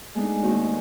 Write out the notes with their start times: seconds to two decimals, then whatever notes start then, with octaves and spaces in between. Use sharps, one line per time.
0.15 G#3 A3 B3 D4 D#4
0.43 D#2 C4 F#4 D#5